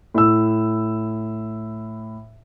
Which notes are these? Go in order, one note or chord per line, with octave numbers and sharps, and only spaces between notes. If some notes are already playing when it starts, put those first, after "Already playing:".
A2 E6